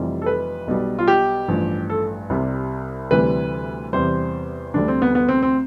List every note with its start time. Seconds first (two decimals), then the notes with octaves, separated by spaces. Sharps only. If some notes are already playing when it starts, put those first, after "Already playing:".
Already playing: F1 F2 C3 E3 G3
0.22 A4
0.26 B4
0.67 B1 B2 G3
0.99 F4
1.08 G4
1.48 A1 G2 F3
1.90 A4
2.30 C2 C3 G3
3.11 D2 C3 E3 G3 B4
3.93 E2 C3 G3 C5
4.74 D2 D3 G3 D4
4.88 C4
5.02 B3
5.15 B3
5.28 C4
5.43 C4